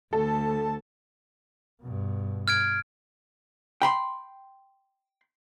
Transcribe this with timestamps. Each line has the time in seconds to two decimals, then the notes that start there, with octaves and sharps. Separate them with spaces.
0.13 D2 A4 A5
1.81 G2 B2
2.48 F6 G#6 D7
3.82 G5 B5 C6